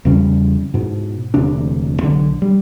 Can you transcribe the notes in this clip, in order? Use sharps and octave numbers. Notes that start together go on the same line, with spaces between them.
E2 C#3 G3 C#4
G#2 B2
E1 D2 C3 D4
B1 D3
G3